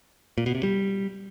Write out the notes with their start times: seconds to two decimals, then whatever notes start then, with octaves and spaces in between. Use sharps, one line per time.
0.38 A#2
0.46 B2
0.55 C3
0.63 G3